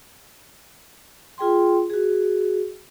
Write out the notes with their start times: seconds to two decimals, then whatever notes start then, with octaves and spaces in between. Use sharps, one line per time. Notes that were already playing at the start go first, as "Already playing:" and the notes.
1.38 F4 G#4 G5 C6
1.90 F#4 G#4